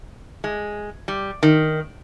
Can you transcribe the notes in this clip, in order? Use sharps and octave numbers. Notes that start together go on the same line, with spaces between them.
G#3
G3
D#3